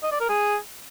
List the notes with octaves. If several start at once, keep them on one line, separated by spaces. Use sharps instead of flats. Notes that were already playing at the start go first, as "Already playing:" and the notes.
D#5
D5
A#4
G#4